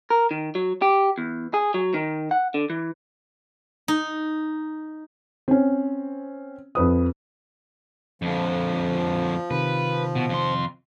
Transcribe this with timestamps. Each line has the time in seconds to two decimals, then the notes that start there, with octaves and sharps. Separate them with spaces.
0.10 A#4
0.31 D#3
0.55 F#3
0.82 G4
1.18 E2
1.54 G#4
1.74 F#3
1.94 D#3
2.31 F#5
2.54 D3
2.70 E3
3.88 D#4
5.48 C4 C#4
6.75 F2 B4 D#6
8.22 F2 D3 F3
9.51 C3 D#3 B4
10.16 B2
10.29 F2 C6